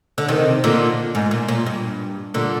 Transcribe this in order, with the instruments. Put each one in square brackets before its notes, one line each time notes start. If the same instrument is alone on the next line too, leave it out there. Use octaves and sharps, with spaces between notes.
[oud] D3
C3 D#3
A#2 D3
G#2
A#2
A#2
G2
A#2 D3